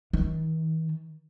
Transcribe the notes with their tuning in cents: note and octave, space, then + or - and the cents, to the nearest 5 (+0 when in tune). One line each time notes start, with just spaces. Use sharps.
D#3 +45